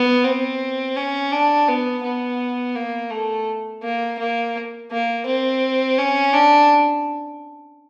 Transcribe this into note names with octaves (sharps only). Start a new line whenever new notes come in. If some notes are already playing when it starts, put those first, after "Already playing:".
Already playing: B3
C4
C#4
D4
B3
B3
A#3
A3
A#3
A#3
A#3
C4
C#4
D4